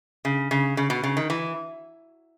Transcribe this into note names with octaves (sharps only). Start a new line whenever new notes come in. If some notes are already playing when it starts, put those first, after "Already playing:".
C#3
C#3
C#3
B2
C#3
D#3
E3